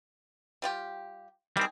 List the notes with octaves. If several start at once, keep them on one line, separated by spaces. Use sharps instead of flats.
G3 F4 G4
D#3 G3 C4 G#4